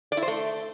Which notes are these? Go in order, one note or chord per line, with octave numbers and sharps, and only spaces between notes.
D5
E4
C5
A3